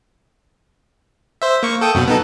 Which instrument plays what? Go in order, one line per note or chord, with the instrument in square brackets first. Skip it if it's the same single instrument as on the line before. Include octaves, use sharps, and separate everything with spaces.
[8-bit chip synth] C5 E5
A#3 C#6
A4 G5 D#6
F#2 B2 F#3
B3 D#4 A4